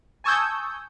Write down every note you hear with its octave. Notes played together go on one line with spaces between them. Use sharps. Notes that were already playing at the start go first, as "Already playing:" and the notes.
G#5 A5 C#6 D#6 E6 G6